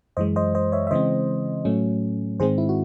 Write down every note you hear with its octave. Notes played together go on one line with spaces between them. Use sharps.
F#2 E3 G#3 C5 D#5
C5 D#5
C5 D#5
C#5 E5
E5
C#3 E3 G#3 C4 C5 D#5
A2 F#3 A3 C#4
G#2 D#3 G#3 C4 G#4 C5
E4
F#4